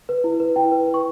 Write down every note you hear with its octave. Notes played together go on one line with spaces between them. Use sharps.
B4
E4
B4
E4 G5
B4
B4
C#6